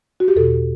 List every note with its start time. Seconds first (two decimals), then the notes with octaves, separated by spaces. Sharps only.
0.20 F#4
0.28 G4
0.35 E2 B2 A4